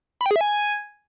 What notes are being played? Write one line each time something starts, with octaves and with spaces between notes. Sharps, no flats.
B5
G5
G#4
E5
G#5